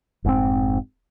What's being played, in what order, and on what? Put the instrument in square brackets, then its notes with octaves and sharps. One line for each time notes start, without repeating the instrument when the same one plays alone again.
[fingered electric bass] F1 G#2 C3 C4